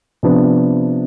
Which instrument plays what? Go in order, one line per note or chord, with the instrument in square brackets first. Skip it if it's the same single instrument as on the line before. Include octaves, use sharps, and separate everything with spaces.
[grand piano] C3 F3 B3 D4